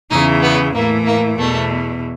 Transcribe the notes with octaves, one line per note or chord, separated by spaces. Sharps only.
E2 C#3 E3 D#4
B3
A2 E3 A#3
A#3
E2 B2 A3